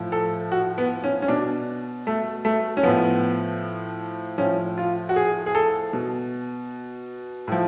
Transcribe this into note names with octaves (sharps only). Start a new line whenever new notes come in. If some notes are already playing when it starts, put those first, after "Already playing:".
Already playing: A2 F3
A4
F#4
B3
C#4
C#4
B2 D4
A3
A3
C#4
A2 F3 B3
A2 F3 C#4
F4
F#4
G#4
G#4
A4
B2
A2 F3